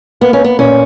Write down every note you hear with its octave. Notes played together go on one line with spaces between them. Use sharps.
A#3 B3
C#4
A#3 B3
A#2 C#4